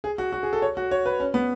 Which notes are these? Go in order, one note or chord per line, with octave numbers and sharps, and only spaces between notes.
G#4
F#4
F#4
G#4
A4
C#5
F#4
C#5
B4
C#4
B3